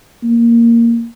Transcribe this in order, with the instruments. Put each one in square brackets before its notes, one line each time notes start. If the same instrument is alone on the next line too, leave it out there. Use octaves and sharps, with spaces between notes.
[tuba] A#3